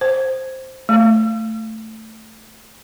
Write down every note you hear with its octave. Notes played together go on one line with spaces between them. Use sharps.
C5
A3